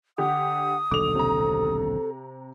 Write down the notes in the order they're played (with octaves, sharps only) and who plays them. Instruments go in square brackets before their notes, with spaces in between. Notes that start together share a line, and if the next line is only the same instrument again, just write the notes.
[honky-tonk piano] D3 G4 [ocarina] F#5 [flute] D#6
[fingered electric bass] D#1 B1 D3 [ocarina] A4 [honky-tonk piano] D6 F7
[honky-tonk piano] C3 A#5